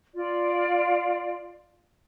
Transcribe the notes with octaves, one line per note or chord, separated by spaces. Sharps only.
F4 D5